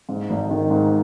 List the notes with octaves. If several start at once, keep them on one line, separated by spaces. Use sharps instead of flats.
G#2
G#1
D#3
G#2